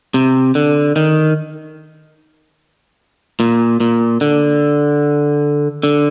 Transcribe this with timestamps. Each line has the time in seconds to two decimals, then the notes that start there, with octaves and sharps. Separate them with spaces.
0.14 C3
0.55 D3
0.96 D#3
3.40 A#2
3.80 A#2
4.21 D3
5.83 D3